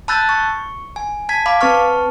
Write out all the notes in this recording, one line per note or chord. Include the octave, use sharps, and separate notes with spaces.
A5 B5 E6 F#6 G6 A6
C#6
G#5
A5 G#6 B6
F5 B5 D6
C4 B4 A5 C#6 F6